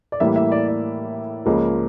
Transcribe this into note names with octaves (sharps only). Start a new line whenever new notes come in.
D5
A2 E3 G3 A#3 E5
E5
D5
D5
C#2 C#3 F3 A#3